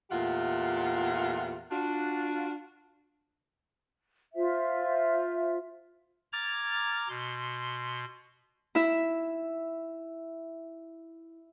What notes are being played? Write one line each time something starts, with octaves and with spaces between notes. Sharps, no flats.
E2 A#2 A3 F4 G4 F#5
D4 F4 F#4
F4 C5 E5
A#5 D6 F6 G#6 A6
B2 C6
E4 E5